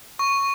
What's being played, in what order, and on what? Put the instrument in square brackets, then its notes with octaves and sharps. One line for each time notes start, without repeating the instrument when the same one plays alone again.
[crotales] C#6